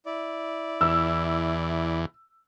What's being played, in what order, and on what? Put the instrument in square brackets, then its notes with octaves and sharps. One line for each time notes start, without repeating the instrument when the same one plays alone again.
[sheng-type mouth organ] E4 D5
[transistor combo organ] E2 [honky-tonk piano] E6